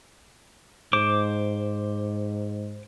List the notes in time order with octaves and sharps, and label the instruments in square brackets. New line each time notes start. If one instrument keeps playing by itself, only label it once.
[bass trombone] G#2 [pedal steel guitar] C5 D6